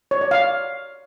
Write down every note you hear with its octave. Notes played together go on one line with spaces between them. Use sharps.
C#5
D5
F5